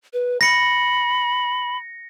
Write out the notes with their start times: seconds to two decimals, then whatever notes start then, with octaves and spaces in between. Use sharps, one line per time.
0.13 B4
0.41 B5 A#6 C#7